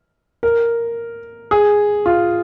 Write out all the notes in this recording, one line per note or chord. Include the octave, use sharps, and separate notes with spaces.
A#4
G#4
F4